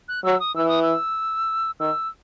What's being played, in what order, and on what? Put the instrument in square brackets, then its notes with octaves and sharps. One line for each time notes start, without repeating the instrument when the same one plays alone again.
[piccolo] F#6
[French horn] F#3 [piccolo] E6
[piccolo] D#6
[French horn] E3 [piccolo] E6
[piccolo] D#6
E6
[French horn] D#3 [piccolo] E6